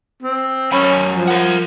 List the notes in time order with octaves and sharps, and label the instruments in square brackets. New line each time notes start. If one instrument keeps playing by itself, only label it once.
[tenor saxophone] C4
[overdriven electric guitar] F#2 B5 [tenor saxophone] C#4
[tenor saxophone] F3
[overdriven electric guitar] A#4 F#5